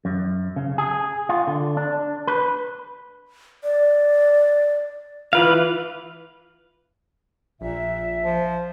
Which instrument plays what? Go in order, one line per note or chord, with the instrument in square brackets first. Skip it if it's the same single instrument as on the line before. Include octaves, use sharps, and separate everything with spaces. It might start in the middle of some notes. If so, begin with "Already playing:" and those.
[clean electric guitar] F#2
C#3
G#4
F4
D3
D4
B4
[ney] D5
[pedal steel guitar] E3 B4 F5 [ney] F4
[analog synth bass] A#1 [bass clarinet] A#2 [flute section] E5
[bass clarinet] F3